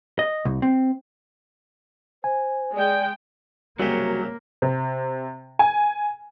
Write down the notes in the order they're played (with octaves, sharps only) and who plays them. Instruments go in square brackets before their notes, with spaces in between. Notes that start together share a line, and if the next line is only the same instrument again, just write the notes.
[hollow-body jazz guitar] D#5
C2
C4
[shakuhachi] C5 [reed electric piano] G#5
[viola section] G#3 G5 [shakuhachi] D5
[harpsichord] C2 C#3 G4 [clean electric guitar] F#3 [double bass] A#3
[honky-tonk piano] C3
G#5